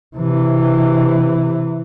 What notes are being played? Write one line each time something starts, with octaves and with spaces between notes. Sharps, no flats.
C3 E3